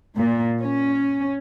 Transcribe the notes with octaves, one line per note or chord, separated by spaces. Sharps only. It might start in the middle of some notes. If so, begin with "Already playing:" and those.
A#2
C#4